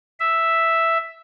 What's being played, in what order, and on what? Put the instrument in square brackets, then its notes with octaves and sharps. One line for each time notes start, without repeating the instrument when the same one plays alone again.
[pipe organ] E5